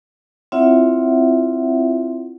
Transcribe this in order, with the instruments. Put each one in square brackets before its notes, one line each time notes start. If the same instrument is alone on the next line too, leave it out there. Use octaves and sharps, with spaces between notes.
[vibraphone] C4 E4 F4 C#5 E5 F#5